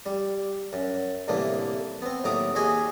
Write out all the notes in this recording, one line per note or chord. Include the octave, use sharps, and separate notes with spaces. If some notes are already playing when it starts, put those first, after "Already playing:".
G3
F#2
C2 A2 D3 E3 A#3
B3 C4
D#2 A2 F#3 A#5 D6 D#6
D#2 F#4 G#4 D#5 G#5 B5